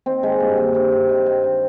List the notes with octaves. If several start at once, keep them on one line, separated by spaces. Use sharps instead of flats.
D#3 C4
D#3 G#3
G2 A#3
D#3
G2 C4
D#3
D#3
D#3
D#3